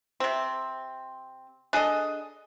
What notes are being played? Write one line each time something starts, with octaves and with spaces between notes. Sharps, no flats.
C3 C4
D4 G#4 A4 D#5